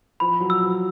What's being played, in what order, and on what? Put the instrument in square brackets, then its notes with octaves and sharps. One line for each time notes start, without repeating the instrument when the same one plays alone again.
[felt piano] F3 [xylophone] B5
[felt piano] F#3
[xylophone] E6
[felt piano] F#3